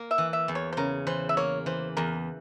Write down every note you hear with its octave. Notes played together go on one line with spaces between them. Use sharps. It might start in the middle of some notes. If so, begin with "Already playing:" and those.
Already playing: A#3
E5
E3
E5
E2
C#5
C5
C#3 A#4
E3 C5
E5
A#3 C#5
E3 C5
E2 A#4